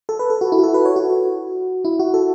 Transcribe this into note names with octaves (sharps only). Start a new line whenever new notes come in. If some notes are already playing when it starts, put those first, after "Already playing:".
A4
B4
A4
F#4
E4
F#4
A4
B4
C#5
F#4
E4
F#4
A4